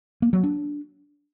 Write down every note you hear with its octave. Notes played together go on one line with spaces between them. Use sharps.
A#3
F#3
D4